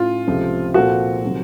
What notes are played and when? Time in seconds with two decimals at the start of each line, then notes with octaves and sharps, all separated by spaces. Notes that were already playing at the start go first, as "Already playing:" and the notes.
Already playing: A2 A3 C#4 F4
0.27 C#2 C3 F3 A3
0.74 A#2 F3 C4 F4 F#4 A4
1.23 C3 D#3 F#3 A3 C4